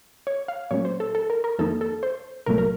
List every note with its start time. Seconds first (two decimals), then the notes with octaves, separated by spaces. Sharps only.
0.27 C#5
0.48 F5
0.71 A#2 F#3 A3 C#4 C#5
0.85 C5
1.00 A4
1.15 A4
1.30 A#4
1.44 A#4
1.59 F2 D#3 A#3 D#4 A4
1.81 A4
2.03 C5
2.46 C2 A#2 F#3 A3 A#4
2.58 A#4